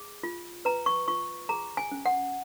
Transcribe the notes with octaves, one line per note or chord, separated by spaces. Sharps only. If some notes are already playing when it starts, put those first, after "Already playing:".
Already playing: G#4
F4
B4 A#5
C#6
F4 C#6
G#4 A#5
G#5
C#4
F#5